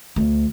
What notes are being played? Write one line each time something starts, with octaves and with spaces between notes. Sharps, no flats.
D2